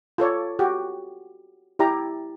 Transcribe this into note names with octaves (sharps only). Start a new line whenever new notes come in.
F4 A4 C#5 D5
F#4 G4
E4 G4 D5 A#5